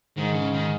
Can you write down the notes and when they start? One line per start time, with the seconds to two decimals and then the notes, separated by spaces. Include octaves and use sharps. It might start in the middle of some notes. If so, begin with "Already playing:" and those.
0.17 G#2 D#3
0.35 C#3
0.53 D#3